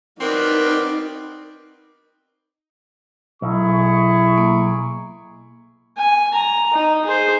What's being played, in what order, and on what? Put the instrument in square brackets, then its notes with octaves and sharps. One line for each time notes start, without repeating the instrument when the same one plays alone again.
[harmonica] B3 F#4 D5 [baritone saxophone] C4 [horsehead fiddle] D#4 [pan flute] A#4
[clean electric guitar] B1 [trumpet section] E4 G#4 C#6
[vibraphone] A#3
[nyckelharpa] G#5
A#5
D#4
G#4 C5